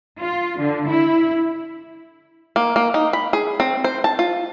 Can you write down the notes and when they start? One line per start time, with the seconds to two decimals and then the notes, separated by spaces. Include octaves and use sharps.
0.21 F4
0.60 D3
0.89 E4
2.56 A#3
2.76 A#3
2.94 D#4
3.13 B5
3.33 G#4
3.60 C4
3.84 C5
4.04 A5
4.19 F4